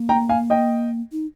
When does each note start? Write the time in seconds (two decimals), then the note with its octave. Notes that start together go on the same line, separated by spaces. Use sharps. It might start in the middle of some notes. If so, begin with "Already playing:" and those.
Already playing: A#3
0.09 G5 A#5
0.29 F5 G#5
0.50 D#5 G5
1.12 D#4